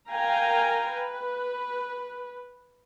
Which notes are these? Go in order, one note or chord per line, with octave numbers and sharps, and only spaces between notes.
A#4 F5 G5 G#5 A#5
B4